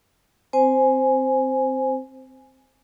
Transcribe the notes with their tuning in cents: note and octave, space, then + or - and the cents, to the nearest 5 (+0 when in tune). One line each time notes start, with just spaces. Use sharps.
C4 +0 C5 +0 G#5 +0